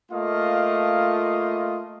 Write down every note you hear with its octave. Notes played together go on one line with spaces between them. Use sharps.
A3 A#3 F4 D#5 F5